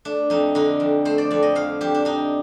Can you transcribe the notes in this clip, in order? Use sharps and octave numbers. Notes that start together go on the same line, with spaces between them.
A3 D4
F2 D#4
D3 D#4
F2
A3 C5
D5
F2 D5
D#5
D3 F5
F2 G4
D4
D4 D#4